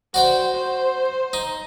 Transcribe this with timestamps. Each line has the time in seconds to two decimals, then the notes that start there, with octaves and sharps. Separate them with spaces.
0.14 F#4 C5 D5 G5
0.55 C5
1.33 D#4